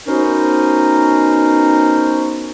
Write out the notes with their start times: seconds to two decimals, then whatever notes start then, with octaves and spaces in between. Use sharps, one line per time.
0.07 B3 C#4 D#4 F#4 A#4 C5